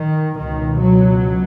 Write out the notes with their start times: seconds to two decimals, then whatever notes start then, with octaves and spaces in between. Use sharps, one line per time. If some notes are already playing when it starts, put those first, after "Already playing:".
Already playing: D#3
0.37 C#2 B2 D#3
0.81 F#3